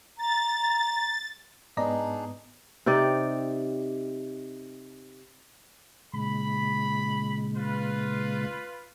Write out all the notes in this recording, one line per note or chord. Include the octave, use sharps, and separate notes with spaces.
A#5 A6
G#2 B3 D4 D#4 G#4 D5 D#5 A#5
C3 D#4 G4 D5
A#2 C#3 G#3 B5
F4 B4